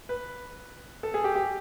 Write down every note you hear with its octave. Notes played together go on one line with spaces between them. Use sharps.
B4
A4
G#4
G4
G4